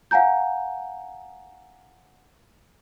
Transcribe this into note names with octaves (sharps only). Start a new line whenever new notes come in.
F5 F#5 G#5 A#5 G6